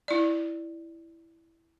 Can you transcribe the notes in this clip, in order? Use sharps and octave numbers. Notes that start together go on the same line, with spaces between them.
E4 D5